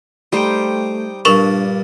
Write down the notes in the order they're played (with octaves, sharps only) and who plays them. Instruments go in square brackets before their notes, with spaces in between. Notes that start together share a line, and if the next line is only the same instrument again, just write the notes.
[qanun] G3 C5 [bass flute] A3 [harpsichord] D#4 G5
[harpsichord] G2 A#2 A5 [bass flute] D4 [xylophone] A#4 C#6 E7